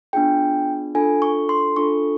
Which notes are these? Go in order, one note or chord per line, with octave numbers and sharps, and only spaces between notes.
B3 D4 F4 G#4 G5
D4 F4 A4 G#5
C#6
C6
D4 F4 A4 C#6